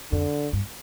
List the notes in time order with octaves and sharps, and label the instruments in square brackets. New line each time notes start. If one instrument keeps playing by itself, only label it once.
[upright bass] F2 [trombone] D3
[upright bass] G2